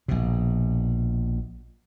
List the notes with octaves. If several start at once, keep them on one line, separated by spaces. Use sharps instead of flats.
A#1 B2